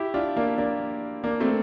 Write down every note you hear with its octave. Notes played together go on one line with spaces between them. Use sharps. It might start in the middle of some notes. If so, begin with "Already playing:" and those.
Already playing: E4 G4
D4 F4
A#3 D4
A#3 D4
A#3 D4
A3 C4